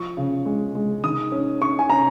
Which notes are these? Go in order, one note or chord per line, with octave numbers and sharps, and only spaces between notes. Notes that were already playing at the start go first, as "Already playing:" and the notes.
Already playing: F3 C#6
C#3
G#3
G#3
D#3 D#6
C#4
C#4 C#6
G#5
C#4 A#5